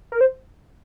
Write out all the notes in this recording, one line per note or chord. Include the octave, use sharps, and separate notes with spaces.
A#4
C5